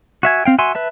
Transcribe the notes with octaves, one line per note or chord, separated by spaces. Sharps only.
F#4 E5 G#5
C4 F5 G5
F#4 E5 G#5 C6
B4 E5 A5